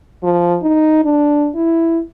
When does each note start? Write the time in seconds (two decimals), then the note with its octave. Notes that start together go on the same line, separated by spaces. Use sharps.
0.23 F3
0.62 D#4
1.05 D4
1.55 E4